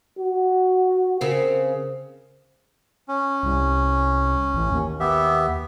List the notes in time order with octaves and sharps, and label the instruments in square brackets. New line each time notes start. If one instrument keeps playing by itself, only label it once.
[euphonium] F#4
[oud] C#3 C4 [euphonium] A#4
[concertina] C#4
[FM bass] C2
A1
D#2
[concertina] B3 G4 E5